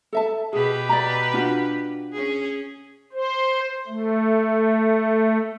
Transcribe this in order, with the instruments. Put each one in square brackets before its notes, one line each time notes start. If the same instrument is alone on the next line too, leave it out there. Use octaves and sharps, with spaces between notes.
[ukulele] A4 E5 A5
[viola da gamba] B2 G4 B4 [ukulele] G#4
[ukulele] D5 D#5 A#5
D4 F4 F#4
[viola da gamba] C#4 G#4
[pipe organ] C5
A3